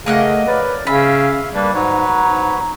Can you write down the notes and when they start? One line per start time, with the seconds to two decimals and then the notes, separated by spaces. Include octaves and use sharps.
0.06 C#3 A3 A#3 D#5 F#5
0.47 A#4 B4 C#5 D5
0.87 C#3 C#4 E5 F5 B5
1.54 G3 A#3 D4 A#4 B4
1.74 G#2 F#3 B4 C#5 A#5
2.21 G#2